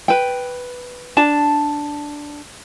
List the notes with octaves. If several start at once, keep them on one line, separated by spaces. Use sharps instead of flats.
B4 G5
D4 A5